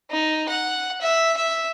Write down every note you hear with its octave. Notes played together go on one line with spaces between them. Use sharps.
D#4
F#5
E5
E5